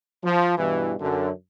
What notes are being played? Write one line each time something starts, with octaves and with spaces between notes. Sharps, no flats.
F3
G2 B2 E3
F#2 D3